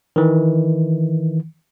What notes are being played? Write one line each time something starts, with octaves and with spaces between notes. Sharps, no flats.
D#3 E3